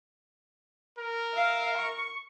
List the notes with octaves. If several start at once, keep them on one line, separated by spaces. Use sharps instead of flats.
A#4
E5 F5
C#6